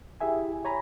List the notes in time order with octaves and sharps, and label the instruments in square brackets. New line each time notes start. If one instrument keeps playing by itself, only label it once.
[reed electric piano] E4 G4 G#4 E5 G#5
C#5 G#5 A#5 B5